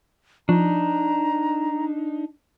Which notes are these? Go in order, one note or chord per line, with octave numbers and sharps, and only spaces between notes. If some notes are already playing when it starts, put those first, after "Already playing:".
F3 D4 D#4 A#5